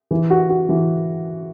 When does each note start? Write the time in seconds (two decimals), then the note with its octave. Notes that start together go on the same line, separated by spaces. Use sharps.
0.11 E3
0.30 F#4
0.49 F#4
0.69 E3